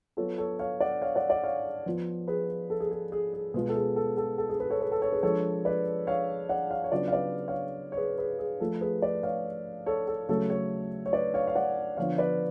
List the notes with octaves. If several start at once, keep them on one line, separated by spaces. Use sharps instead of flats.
F#3 B3 F4 A4 C#5
A4 C#5
C#5 F5
D5 F#5
C#5 F5
D5 F#5
D5 F#5
C#5 F5
F3 B3 F4
G#4 B4
A4
G#4
G#4
G#4
G#4
B2 G#3 B3 F4 G#4
A4
G#4
A4
A4
A4
G#4
G#4 B4
A4 C#5
G#4 B4
A4
A4 C#5
G#4 B4
F3 G#3 D4 A4 C#5
B4 D5
C#5 F5
D5 F#5
C#5 F5
C#5
C#3 F#3 B3 D4 F4 B4 D5
F5
B4 D5
C#5 F5
C#5
G#4 B4
G#4 B4
G#4
F3 A3 F4 A4
G#4 B4
B4 D5
C#5 F5
A4 C#5
A4
C#3 F#3 A3 A4 C#5
A4 C#5
C#5
B4 D5
C#5 F5
F5
D5 F#5
D3 F3 B3 C#5 F5
B4 D5